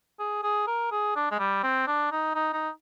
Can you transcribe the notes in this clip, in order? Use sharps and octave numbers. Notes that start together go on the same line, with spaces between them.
G#4
G#4
A#4
G#4
D4
G#3
G3
C4
D4
D#4
D#4
D#4